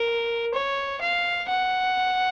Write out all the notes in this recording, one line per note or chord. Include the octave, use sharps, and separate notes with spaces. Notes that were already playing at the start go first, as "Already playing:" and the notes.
Already playing: A#4
C#5
F5
F#5